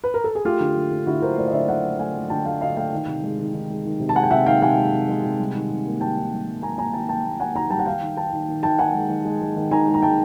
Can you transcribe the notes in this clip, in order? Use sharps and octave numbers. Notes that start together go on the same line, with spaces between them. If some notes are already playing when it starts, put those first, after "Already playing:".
B4
A#4
A4
G#4
A3 F4 G4
D3
D3
D3
D3 E4 F#4
D3 A#4 C5
A3 C5 D5
D#5
D3 D5 E5
D3 E5 F#5
A3
A3 F#5 G#5
A3
D3 G5 A5
A3 F5 G5
D3 D#5 F5
A3 F5 G5
D#3
C3
G#3
D#3
D#3
G#3
D#3
C3
A5
G#3 F#5 G#5
G5
C3 E5 F#5
D#3 F5 G5
C3 F#5 G#5
G#3
C3
G#3
C3
G3
D#3
C3
A#3
D#3 G5 A5
D#3
G3
G3
A#3 G#5 A#5
A#3 G#5 A#5
D#3 G5 A5
A#3 G5 A5
A#3
A#3 F#5 G#5
D#3 G#5 A#5
G3 G5 A5
F#5
D#3 F5 G5
D#3
D#3 G5 A5
D#3
D#3
D#3 G5 A5
D#3 F#5 G#5
G#3
D#3
G#3
G#3
D#3
D#3 G#5 A#5
G#3
A#5
G#3 G5 A5